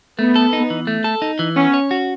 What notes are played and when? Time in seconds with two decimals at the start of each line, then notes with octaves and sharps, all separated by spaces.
0.19 A3 B3
0.36 A4
0.53 D#4
0.70 E3
0.87 A3
1.04 A4
1.22 D#4
1.39 E3
1.56 B3 C#4
1.74 C#5
1.91 F#4